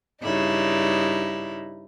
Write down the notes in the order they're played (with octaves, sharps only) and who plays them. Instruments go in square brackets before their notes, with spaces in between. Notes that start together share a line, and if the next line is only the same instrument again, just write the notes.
[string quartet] G2 C#3 D#4 E4